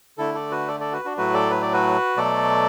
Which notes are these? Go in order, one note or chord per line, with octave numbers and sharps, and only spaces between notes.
D3 A3 E4 A4
A4 D5
F#4 B4
A4 D5
A4 D5
F#4 B4
D4 F#4
A2 F#3 A3 F#4 B4
A4 D5
B4
D5
F#4 B4
B2 F#3 A3 A4 D5